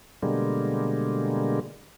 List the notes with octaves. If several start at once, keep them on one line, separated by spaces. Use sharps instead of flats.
B2 D3 G3 G#3 A#3